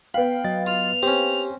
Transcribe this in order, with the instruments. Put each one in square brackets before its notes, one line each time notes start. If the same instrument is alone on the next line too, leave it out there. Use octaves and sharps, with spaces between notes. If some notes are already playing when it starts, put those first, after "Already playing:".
[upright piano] B3 F5 [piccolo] G5 [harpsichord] B5
[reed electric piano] F#3 D#5 A6
[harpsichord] F4 [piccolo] F7
[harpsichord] C4 C#4 [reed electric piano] G4